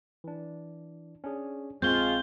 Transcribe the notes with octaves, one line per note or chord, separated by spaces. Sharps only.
E3 D4
C#4 D4 G#4
A#1 G#3 C4 F4 C#6 F6 G6 G7